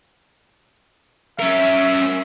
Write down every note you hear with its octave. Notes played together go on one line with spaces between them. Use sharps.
C#4 A#4 E5